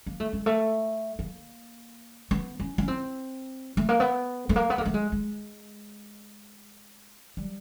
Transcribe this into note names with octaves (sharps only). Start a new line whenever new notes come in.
A#3
A3
G#3
A3
A#3
B3
C#4
C#4
C4
A3
A#3
B3
A3
A#3
B3
A#3
A3
G#3
G#3
G3